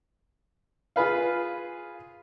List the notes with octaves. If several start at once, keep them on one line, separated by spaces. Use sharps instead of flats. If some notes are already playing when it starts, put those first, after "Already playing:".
F4 G#4 B4 F5